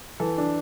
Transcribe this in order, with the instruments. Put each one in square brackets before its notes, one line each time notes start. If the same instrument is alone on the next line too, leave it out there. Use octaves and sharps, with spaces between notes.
[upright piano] E3 A4
D4